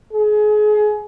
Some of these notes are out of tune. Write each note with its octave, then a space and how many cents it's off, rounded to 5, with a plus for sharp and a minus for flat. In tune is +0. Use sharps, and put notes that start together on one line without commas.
G#4 +30